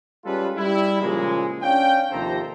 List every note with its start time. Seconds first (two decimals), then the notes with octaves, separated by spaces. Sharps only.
0.25 G3 G#3 C#4 F4 A4 B4
0.56 G3 E4
1.01 A#2 C#3 F3 G#3
1.62 C#4 D4 F5 G5
2.12 D#2 C3 F3 A4 C5 A#5